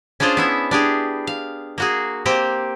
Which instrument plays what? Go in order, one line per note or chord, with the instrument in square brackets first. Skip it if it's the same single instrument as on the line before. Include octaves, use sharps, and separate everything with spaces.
[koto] C#4 D4 F4 G#4 C5 F5
B3 E4 E5
D4 G4 G#4
F5
A#3 F#4 G#4
A#3 C4 G4 C5 G5